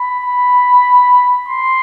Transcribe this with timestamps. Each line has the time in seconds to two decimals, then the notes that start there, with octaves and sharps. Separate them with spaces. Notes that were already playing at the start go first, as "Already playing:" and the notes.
Already playing: B5
1.48 C6